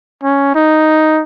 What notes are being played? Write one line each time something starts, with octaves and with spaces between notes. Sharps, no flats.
C#4
D#4